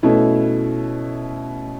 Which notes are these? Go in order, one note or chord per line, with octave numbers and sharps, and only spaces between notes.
B2 A3 C#4 E4